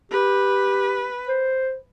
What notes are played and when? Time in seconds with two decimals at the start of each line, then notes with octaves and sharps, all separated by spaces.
0.12 G4 B4
1.28 C5